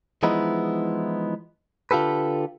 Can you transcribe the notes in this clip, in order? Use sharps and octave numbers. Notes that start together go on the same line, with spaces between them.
E3 F3 G#3 B3 D#4 E4
D3 F4 G4 A4 B4